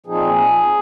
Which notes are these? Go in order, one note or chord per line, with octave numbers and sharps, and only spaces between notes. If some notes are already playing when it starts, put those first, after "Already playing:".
A#2 F3 C4 D#4 G#4